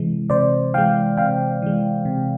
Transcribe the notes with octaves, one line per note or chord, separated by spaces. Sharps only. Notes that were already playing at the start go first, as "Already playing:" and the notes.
Already playing: C3 E3 G#3
C3 C5 D5
E3 G#3 F5 G5
C3 F5 G5
E3 G#3
C3